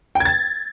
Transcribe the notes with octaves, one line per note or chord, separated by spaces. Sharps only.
G5
G#6
A6